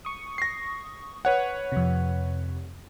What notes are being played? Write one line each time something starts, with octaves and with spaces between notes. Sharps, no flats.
C#6 D#6
A#6 C7
B4 C#5 F#5
F2 C3